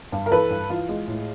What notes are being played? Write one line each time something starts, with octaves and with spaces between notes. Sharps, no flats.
G2
A#4
E3 A4 B4
G2
E3 F4
G#3
A2